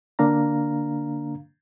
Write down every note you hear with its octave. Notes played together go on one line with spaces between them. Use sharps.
D3 A#3 D4 F5 A#5